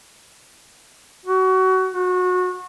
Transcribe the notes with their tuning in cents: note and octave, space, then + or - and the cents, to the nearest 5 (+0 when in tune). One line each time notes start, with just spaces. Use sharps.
F#4 +25
F#4 -25